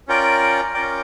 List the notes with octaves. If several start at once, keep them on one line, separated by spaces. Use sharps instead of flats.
C#4 F4 A#4 D5 G5
C#4 F4 A#4 D5 G5